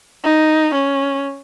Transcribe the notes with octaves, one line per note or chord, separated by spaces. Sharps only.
D#4
C#4